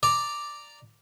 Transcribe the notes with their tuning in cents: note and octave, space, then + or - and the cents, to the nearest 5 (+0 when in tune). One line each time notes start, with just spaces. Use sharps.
D5 +0 A#5 -5 D6 +0